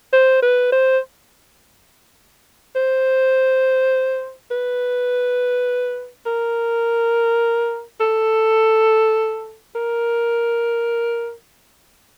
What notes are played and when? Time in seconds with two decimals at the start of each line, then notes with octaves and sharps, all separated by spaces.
0.13 C5
0.43 B4
0.72 C5
2.76 C5
4.51 B4
6.26 A#4
8.01 A4
9.75 A#4